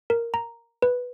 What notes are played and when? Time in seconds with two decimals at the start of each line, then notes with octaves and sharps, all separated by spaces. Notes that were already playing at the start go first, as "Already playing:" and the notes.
0.10 A#4
0.34 A#5
0.82 B4